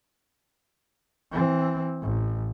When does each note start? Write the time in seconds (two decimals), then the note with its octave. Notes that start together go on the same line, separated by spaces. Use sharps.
1.32 E3 C4
2.02 A1